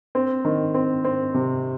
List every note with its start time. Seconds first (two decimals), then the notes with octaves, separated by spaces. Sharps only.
0.15 C4
0.45 D#3
0.74 C4
1.05 C4
1.34 C3